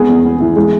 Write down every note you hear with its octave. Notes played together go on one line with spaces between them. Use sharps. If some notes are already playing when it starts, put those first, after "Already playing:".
Already playing: G#3 B3 G#4
E2
B3
E3
G#3